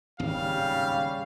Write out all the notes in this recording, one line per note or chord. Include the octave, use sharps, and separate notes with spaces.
D1 G#1 D#2 C#3 G3 F5